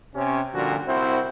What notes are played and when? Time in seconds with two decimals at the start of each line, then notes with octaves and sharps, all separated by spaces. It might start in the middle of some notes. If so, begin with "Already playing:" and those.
0.14 C3 C#4
0.54 A#2 D3 F3 G3 F#4
0.87 C2 C4 E4 F#4 C5